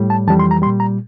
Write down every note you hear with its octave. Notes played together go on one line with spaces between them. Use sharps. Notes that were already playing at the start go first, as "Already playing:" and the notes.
Already playing: A2 G3
A5
F2 E3 G3 A5
C6
A#5
A#2 G3 C6
A#5